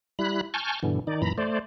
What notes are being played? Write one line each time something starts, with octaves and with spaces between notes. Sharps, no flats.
G3 E4 B5 F#6
G#5 A5 C#6 F6 G6
G2 B2 D3 E3
D#3 D#4 D5
F#2 A#2 E3 A#5 B5
A3 C5 D5